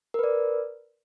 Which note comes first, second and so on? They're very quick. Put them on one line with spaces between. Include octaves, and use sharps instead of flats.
A#4 B4 D5